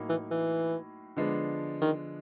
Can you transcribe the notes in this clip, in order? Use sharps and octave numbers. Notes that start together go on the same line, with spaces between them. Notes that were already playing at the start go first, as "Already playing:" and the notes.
Already playing: A2 F#3 A#3 D#4
E3
E3
D3 F3 G#3 B3 D4
D#3